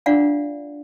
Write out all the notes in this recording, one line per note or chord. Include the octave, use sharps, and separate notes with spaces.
D4 F4 D5 F5 F#5